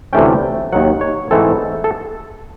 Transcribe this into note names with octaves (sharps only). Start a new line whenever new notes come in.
D2 C3 E3 A3 C#4 G5
D#2 D#3 F#3 F#5
C#5
G#2 E3 A3 C4 A4
A4